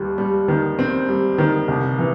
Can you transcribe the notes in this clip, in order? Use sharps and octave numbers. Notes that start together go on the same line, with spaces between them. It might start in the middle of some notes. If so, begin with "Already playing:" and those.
Already playing: D#2 G3
G3
D#3
C4
G3
D#3
C2
E3